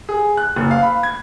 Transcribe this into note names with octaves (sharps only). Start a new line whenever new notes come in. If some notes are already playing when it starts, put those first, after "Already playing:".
G#4
F#6
F#1
F5
B5
G#6